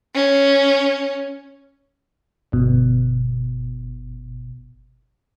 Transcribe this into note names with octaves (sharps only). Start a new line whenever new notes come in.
C#4
G1 B2